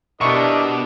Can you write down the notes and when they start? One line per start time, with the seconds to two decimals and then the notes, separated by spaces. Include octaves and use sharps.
0.21 B2 D4 E4 G4 A#4 D#5 C#6